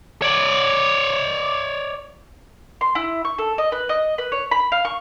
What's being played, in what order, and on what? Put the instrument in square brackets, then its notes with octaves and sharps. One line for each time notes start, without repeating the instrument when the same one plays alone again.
[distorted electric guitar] C#5 D5
[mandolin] C6
E4
C#6
A4
D#5
B4
D#5
B4
C#5
B5
F5
C#6